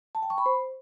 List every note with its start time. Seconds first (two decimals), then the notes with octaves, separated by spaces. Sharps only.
0.15 A5
0.22 G5
0.30 C#6
0.38 B5
0.46 C5